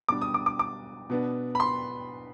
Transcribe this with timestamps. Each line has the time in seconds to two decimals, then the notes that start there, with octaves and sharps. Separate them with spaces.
0.09 B2 G3 D4 D6
0.21 D#6
0.34 D6
0.46 D6
0.59 D6
1.10 B2 B3 D4
1.55 B5
1.60 C6